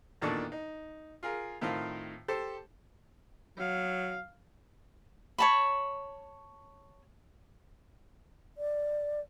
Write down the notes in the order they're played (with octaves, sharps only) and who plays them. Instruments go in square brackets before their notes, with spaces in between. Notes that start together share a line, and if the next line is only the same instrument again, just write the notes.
[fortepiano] E2 A#2 D#3 D4 A4 C#6
D#4
F4 G#4 A#4
A2 D#3 C4 F4
G4 A4 C5
[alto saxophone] F#3 [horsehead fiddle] F5
[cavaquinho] C#5 A5 B5
[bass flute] D5